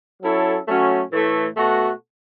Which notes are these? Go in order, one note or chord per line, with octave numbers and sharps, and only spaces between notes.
F#3 C#4 E4 A4 C#5
F#3 A3 C#4 F#4
A2 E3 A3
B2 A3 F#4 A4